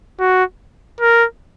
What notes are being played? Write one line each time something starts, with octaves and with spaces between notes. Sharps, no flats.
F#4
A#4